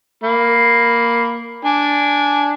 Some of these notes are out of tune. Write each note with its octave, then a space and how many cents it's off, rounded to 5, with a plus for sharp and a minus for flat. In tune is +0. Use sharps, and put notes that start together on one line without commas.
A#3 +0 B5 +0
D4 -10 G#5 +0